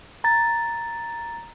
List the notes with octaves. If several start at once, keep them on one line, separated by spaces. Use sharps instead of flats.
A#5 A6